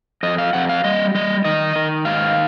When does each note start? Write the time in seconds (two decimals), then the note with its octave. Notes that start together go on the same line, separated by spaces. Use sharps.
0.23 F2 D#5
0.38 F5
0.53 F2 F#5
0.69 F5
0.84 G3 D#5
1.15 G3 D#5
1.45 D#3 D#5
1.75 D#3
2.05 G#2 F5